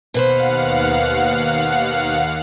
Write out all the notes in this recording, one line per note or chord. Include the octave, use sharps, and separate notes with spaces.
D#2 B2 B4 C5 F5 F#5